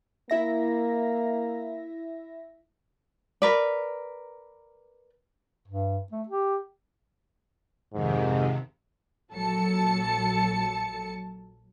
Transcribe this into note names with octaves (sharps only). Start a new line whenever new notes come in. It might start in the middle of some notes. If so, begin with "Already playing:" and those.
A#3 E4 E5 A#6
A#4 B4 D5
G2
A3
G4
F2 G#2 C3 D#3
A#1 F#3 A4 A5 C#7